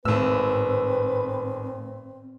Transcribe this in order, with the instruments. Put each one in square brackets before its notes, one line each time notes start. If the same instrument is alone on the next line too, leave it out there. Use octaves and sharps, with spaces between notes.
[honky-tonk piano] G#1 E6 [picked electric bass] A2 [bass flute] C4 [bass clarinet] B4